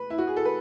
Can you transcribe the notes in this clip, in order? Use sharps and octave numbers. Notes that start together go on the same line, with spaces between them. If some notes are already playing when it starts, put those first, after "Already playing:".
Already playing: B4
E4
F#4
G#4
A4
B4